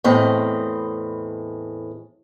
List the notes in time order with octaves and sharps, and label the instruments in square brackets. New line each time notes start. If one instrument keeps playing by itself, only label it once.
[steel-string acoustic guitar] E2 A2 C4 D#5